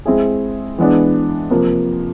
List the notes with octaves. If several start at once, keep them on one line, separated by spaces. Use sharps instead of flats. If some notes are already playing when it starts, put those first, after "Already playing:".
G#3 C4 E4 G#4
E3 G#3 B3 D4
C3 F3 A#3